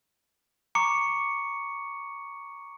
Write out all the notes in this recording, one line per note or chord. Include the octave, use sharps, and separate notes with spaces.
A#5 C#6 D6 C#7